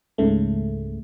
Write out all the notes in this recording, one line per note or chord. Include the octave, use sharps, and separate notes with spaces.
C#2 G#2 C#3 A3